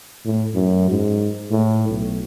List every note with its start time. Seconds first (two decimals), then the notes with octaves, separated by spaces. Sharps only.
0.25 A2
0.54 F#2
0.89 G#2
1.51 A2
1.88 B1